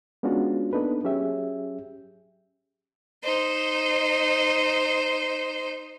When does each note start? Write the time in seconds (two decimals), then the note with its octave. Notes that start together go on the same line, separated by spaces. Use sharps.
0.23 G#3 B3 C#4 D4 F4 F#4
0.73 A#3 B3 D4 D#4 A4 B4
1.04 F#3 C#4 G4 G#4 E5
3.23 D#4 C5